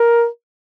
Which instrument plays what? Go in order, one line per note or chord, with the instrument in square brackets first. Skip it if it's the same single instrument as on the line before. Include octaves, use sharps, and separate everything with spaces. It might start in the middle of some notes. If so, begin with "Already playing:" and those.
Already playing: [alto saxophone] A#4